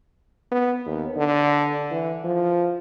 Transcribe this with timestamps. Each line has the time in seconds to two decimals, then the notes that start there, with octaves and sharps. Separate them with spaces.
0.52 B3
0.86 D#2
1.17 D3
1.91 E3
2.25 F3